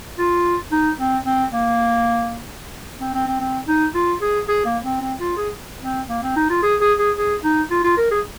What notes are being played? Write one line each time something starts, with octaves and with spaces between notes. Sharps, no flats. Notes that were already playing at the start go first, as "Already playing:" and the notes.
F4
D#4
C4
C4
A#3
C4
C4
C4
C4
D#4
F4
G#4
G#4
A#3
C4
C4
F4
G#4
C4
A#3
C4
D#4
F4
G#4
G#4
G#4
G#4
D#4
F4
F4
A#4
G#4